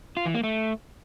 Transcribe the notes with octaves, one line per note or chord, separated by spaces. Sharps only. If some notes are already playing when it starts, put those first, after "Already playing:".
F4
E3
A#3
A3